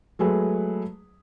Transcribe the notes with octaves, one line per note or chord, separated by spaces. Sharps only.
F#3 G#3 A3 G#4 B4